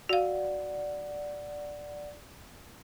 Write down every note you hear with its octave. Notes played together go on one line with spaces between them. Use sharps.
F#4 D5 F5 F#5